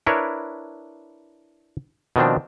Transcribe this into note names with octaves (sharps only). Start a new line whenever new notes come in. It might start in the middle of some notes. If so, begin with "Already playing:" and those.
D4 E4 A#4 B4 C#5
B2 D#3 F3 C4 D4